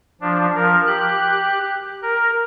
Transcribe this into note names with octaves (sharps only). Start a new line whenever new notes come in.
F3 D4
F3 A#4
G4 F#6
A#4